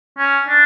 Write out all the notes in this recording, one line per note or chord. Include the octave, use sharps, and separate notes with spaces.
C#4
D4